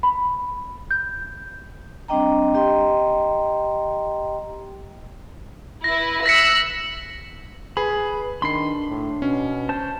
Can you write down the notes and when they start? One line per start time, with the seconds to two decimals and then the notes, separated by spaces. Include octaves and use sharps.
0.03 B5
0.91 G6
2.08 G3 C4 D4 D#5 G5 A#5
2.54 G4 D#5 G5 A#5 C6
5.84 E4 B4 A#6
6.26 E6 F#6 A#6 B6 C#7
7.77 G#4 B4 B5
8.42 D#3 D4 B5 C6 C7
8.90 A2
9.22 B2 C#4
9.69 C5 A5